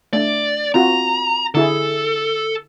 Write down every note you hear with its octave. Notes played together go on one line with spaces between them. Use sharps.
A3 D4 D5
C4 F4 F#4 A#5
D3 E4 G#4 A4